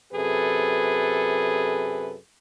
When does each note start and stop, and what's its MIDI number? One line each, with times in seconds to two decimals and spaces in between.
0.13 2.15 42
0.13 2.15 48
0.13 2.15 68
0.13 2.15 69
0.13 2.15 71